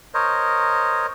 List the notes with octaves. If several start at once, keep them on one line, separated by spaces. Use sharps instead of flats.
A#4 C5 C#5 D#5